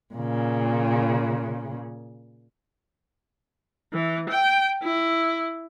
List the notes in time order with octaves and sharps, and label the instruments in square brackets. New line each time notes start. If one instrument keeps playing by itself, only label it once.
[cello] A#2 C#3
[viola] E3
G5
E4